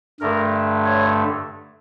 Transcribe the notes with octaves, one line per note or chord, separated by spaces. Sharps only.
G2 D3 A3 A#4
C#5